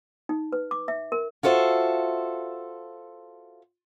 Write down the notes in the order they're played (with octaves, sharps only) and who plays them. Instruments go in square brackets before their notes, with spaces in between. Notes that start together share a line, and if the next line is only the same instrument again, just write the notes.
[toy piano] D#4
B4
D6
E5
A#4
[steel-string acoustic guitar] F4 F#4 A4 C5 E5